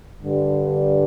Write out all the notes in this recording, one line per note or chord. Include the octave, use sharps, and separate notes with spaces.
G2 D3 G3